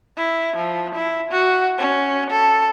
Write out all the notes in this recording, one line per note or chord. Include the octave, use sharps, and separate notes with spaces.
E4
F3
E4
F#4
C#4
A4